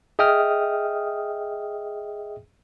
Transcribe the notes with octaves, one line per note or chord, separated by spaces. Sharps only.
G#4 D#5 E5 G5 D#6 F6